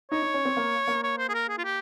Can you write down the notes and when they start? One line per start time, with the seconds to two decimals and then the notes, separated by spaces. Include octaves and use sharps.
0.11 D#4 C#5
0.22 D#4
0.34 C#4
0.45 C4
0.57 A#3
0.88 A#3
1.03 C#5
1.18 C5
1.29 G#4
1.34 A#4
1.49 G#4
1.58 F4
1.64 G4